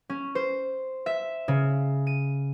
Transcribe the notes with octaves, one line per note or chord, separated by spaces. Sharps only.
C#4
C5
E5
C#3
D#7